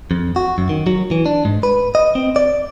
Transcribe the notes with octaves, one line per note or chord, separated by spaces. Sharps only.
F2
F#4
F#2
D#3
F#3
E3
D4
G#2
B4
D#5
C4
D5